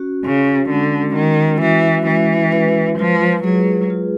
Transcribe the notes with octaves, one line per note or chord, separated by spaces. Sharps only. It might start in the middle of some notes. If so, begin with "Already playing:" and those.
Already playing: C#4 F#4
C#3 C#4
D3 G#3
D#3 G#3
E3 F#4
E3 G#3
B4
F3 F4
F#3 G#4
F4